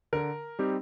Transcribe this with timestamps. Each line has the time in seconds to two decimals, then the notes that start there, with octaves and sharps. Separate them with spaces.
0.13 D3 A#4
0.59 G3 C4 D#4 G4